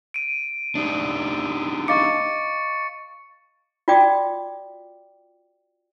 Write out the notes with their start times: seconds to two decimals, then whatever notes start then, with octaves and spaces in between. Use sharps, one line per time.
0.14 D7 D#7
0.75 D4 D#4 G4
1.88 D#5 F5 C#6 D6 A6 C#7
3.88 F4 F#4 D5 G5 D6 D#6